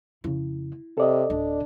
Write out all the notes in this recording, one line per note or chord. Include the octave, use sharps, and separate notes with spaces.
F2 C#3 E4
C3 A4 D5 D#5
D1 D4